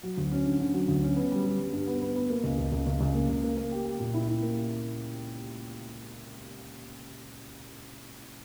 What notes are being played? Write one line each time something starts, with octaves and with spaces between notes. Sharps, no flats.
F#3
D2
C#4
D3
D3
F#3
D2
C#4
B3
G3
G3
G3
G2
B3
B3
B3
A#3
C#2
C#2
C#2
C#2
C#2
A#3
C#2
A#3
A#3
G4
G4
A#2
E4
E4
A#3